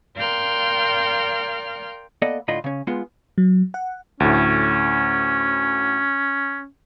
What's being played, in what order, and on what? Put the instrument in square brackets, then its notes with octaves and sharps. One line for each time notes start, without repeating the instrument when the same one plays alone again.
[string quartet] A#4 D5 F5 G5 C6 F6
[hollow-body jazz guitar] A#3 B3 A4 D5 D#5
A2 D3 F4 D#5 B5
C#3 C#4
G#3 B3 F4
[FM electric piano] F#3
F#5
[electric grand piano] D2 A2 [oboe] C#4